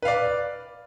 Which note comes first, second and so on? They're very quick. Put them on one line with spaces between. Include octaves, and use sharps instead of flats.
B4 F5 D5